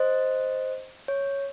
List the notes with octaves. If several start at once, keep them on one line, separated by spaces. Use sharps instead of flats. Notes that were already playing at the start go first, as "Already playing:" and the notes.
Already playing: C5 D#5
C#5